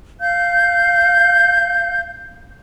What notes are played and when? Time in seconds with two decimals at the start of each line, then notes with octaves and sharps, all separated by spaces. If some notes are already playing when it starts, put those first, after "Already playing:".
0.20 F5 G6